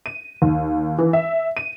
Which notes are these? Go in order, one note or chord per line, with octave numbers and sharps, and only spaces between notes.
D#7
D#2
E3
E5
D#7